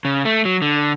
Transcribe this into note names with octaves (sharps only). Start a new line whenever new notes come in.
C#3
A3
F#3
D3